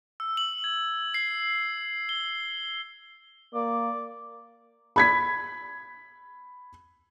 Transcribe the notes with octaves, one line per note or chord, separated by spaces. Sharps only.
E6
F#7
G#6
C7
G7
A#3 D5
B5 G#6 B6